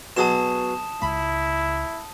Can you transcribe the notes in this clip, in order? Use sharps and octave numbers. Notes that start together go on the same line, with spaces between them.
B2 F#3 G#4 A5 D#6 E7
C#2 G#3 E4 B5